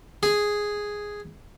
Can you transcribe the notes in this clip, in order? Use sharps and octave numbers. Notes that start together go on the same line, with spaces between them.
G#4